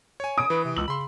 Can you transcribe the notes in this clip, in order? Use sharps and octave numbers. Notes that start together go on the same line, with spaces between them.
C#5 G#5
D#6 D7
E3 B4
C3
C#2 E6 F#7
C#3 B5 C6